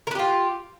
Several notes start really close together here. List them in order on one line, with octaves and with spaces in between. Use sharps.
A#4 B4 G4 F4